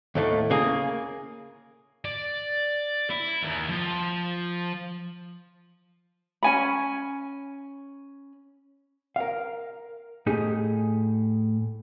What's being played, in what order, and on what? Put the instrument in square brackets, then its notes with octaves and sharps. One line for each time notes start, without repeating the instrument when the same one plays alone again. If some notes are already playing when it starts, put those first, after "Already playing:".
[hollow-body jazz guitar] D#2 A2 A3
C#3 A#3 G#4
[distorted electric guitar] D5
E4
D#2
F3
[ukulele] C#4 G#5 B5
[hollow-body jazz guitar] A#4 F5
A2 D#4 G4 G#4